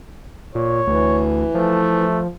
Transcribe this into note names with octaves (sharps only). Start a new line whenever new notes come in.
A#2 C#5
D2 E3
F3 A3